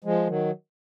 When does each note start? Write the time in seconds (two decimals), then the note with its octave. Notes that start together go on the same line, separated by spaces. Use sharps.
0.04 F3 G#3
0.27 D#3 F#3